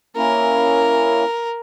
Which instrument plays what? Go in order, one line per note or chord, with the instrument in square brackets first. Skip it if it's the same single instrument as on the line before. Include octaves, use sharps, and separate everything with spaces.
[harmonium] A#3 C#4 E4 [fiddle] A#4